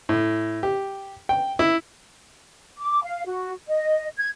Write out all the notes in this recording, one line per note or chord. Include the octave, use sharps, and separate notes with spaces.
A2
G4
G5
E4
D6
F5
F#4
D#5
G#6